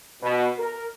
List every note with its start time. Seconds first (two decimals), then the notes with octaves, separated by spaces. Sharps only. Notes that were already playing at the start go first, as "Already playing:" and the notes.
0.22 B2
0.59 A#4